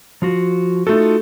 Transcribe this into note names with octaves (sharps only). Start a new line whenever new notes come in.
F3 F4 F#4
A3 D#4 F4 F#4 A4